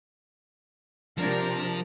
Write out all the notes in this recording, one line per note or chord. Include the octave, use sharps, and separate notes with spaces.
C3 F3 D4 A#4